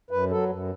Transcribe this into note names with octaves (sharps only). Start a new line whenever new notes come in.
F#2 B4
F#3 A4
F#2